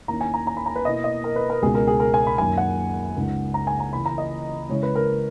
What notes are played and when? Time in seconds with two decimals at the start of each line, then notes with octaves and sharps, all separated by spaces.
0.08 D#2 D#3 A#3 C#4 E4 A#5
0.21 G#5
0.34 A#5
0.47 A#5
0.57 B5
0.66 A#5
0.76 B4
0.85 B2 A#3 E4 D#5
1.04 D#5
1.24 A#4
1.36 B4
1.50 A#4
1.62 C#2 B2 G#3 G#4
1.75 A#4
1.87 G#4
2.00 A#4
2.14 G#5
2.27 B5
2.38 F#2 D#3 A#3 G#5
2.58 F#5
3.16 C#2 C#3 G#3 D#4
3.54 A#5
3.67 G#5
3.80 A#5
3.93 C#3 E3 A#3 B5
4.06 A#5
4.18 D#5
4.69 C#3 G#3 C#4 E4 C#5
4.83 B4
4.95 A#4